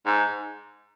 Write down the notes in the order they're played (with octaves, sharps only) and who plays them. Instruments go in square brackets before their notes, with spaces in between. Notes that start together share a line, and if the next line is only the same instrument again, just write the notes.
[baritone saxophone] G#2